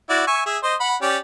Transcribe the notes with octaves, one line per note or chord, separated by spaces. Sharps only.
E4 F#4 D5
E5 G#5 C#6
G#4 E5
C5 D#5
F#5 B5
C#4 G4 D5